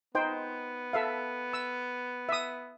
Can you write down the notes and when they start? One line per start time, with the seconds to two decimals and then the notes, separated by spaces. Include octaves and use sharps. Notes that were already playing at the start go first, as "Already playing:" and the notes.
0.15 B3 D#4 C5 G5
0.93 A4 E5 F5
1.53 E6
2.29 E5 D#6